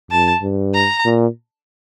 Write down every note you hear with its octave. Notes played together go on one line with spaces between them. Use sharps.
F2 A5
G2
A#5
A#2